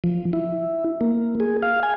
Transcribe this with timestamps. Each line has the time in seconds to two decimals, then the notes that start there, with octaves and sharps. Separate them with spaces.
0.04 F3
0.33 E4
1.01 A#3
1.40 G#4
1.63 F5
1.83 G#5